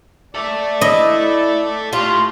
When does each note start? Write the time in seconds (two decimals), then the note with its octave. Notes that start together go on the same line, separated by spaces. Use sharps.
0.35 A4 D5 E5
0.81 E4 D#5
1.93 A2 F4 G4